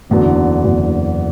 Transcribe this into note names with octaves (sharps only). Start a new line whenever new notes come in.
F#1 E2 D3 F#3
F#1 E2 D3 F#3